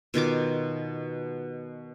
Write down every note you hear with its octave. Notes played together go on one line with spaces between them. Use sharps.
B2 D#3 F4 D6